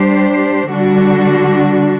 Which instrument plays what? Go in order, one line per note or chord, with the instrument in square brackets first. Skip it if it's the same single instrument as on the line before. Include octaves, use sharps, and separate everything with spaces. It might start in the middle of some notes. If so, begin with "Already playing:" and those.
Already playing: [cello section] G3 D4 G4 C5
D3 G3 D4 F#4